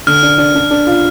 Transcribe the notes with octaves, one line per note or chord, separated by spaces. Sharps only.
D3 F6
D4
D4
D4
D4
F4